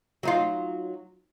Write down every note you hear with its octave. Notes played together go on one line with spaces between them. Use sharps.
F#3 D#4 F4